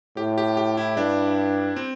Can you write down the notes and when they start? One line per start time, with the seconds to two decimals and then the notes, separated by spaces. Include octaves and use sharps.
0.17 A2 G4
0.38 G4
0.57 G4
0.77 E4
0.97 G2 D4
1.76 C4